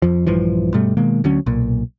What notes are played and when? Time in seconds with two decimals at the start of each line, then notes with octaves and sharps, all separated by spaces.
0.02 F2 F3
0.27 A#1 G2 E3 F3
0.74 G2 B2 G3 A3
0.97 B2 D#3 G#3 A#3
1.24 D2 D3 F#3 C#4
1.46 B1 A#2